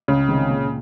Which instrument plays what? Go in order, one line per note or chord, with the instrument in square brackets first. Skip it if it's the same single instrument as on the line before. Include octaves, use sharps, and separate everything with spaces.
[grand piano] C#2 [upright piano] C#3
[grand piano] C3 D#3 G#3
A#2